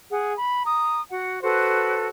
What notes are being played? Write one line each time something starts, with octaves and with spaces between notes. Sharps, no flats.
G#4 F#5
B5
A#5 D#6
F#4 F#5
F#4 A4 B4 C5